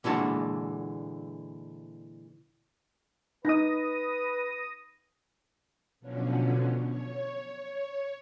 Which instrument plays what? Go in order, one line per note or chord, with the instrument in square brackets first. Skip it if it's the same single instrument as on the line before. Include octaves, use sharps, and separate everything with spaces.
[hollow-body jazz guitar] A#2 D3 E3 G#3 F#4 A5
[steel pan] D#4 [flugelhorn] B4 [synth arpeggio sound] D#6 A#6
[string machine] B2 D3 F3 F#3 C#4
C#5